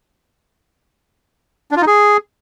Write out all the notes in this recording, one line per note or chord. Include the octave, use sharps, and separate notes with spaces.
D4
F4
D#4
G#4